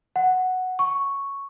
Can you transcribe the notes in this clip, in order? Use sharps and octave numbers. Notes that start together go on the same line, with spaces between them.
F#5
C#6